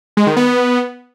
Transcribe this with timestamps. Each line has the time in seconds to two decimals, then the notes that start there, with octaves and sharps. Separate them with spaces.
0.17 G#3
0.27 D#3
0.36 B3